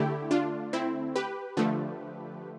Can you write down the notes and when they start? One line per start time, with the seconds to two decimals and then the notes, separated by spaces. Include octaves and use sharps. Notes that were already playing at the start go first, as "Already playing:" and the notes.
Already playing: D3 A3 E4 G4
0.31 D4 F4
0.73 C4 E4
1.16 G4 B4
1.57 D3 F3 A3